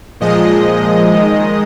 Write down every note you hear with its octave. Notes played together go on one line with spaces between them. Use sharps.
A#2 F3 G#3 D#5
D#3 G#3